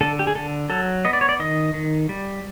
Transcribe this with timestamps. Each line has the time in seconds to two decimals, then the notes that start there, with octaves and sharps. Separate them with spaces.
0.01 D3 A4
0.19 G4
0.27 G#4
0.35 D3 A4
0.70 F#3 A4
1.05 B3 D#5
1.13 D5
1.21 C#5
1.29 D5
1.40 D#3 D#5
1.74 D#3
2.09 G3